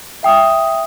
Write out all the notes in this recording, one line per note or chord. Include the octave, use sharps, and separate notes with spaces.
E5 G5 D#6